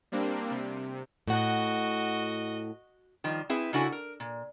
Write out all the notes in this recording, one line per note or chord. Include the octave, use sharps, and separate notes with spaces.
G3 A#3 C4 D4
C3
A2 F#4 D#5 F#5
D#3 F3 G3
C4 E4 G#4 B4 E5
C#3 D4 E4 F#4 A4 G#5
A#4
A#2